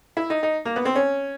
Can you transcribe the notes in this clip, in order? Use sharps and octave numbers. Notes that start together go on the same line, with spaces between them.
E4
D#4
D#4
A#3
B3
C4
C#4